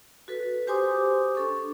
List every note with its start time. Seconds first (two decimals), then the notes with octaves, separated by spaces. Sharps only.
0.28 F#4 A4 B4
0.67 G4 C5 G#5 C6 D6 D#6
1.35 D4 A4 C#6